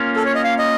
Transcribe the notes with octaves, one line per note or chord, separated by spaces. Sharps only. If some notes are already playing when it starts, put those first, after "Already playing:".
Already playing: A#3 C#4 F4
A4
C#5
D#5
F5
D#5